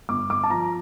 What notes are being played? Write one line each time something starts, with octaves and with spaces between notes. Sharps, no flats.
G1 D6
G1 D6
A5
F3 A#5